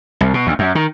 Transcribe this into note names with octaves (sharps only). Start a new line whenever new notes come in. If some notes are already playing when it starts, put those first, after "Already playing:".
C2
B2
D2
F#2
D#3